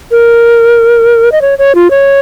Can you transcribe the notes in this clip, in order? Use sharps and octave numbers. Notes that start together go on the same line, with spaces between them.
A#4
D#5
C#5
C#5
F4
C#5